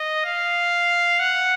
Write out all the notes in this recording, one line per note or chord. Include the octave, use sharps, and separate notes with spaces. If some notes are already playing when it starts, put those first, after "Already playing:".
Already playing: D#5
F5
F#5